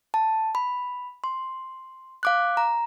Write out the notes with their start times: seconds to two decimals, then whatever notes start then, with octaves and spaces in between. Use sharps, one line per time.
0.14 A5
0.55 B5
1.24 C6
2.23 F5 D6 F#6
2.57 A#5